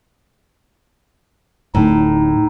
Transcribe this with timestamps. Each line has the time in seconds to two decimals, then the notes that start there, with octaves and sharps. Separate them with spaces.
1.75 D1 A2 D#4